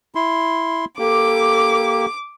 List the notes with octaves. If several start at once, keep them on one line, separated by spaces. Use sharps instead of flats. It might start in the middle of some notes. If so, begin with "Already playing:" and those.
E4 C6
A#3 G4 A4 D6